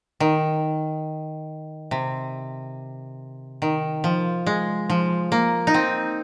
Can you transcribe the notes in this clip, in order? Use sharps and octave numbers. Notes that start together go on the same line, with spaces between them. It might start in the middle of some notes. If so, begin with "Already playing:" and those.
D#3
C3
D#3
F3
G#3
F3
A#3
D#4
C4